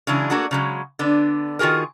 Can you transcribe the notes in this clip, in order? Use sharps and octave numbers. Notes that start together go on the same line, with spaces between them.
C#3 E3 F#3 G#3 D4
A3 A#3 D4 F#4 G#4
C#3 F#3 G#3
D3 B3 D4
D#3 F4 F#4 G#4 A#4